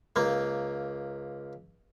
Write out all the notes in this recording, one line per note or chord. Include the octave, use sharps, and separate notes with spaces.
C#2 A#3